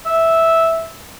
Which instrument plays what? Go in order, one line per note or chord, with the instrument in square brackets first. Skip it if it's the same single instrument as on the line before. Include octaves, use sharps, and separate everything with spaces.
[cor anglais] E5